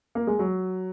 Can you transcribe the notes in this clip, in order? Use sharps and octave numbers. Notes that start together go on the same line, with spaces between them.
A#3
G#3
F#3